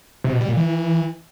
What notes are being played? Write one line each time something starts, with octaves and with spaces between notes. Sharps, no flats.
C3
B2
G3
A#2
E3